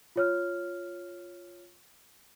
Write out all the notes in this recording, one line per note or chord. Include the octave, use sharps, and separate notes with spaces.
F4 C#5 F6